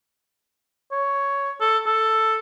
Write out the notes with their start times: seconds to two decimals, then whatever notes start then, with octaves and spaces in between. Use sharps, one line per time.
0.92 C#5
1.61 A4
1.86 A4